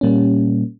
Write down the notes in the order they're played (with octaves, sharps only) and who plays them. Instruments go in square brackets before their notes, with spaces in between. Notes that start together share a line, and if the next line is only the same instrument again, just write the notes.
[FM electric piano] A#2 G3 A#3 C#4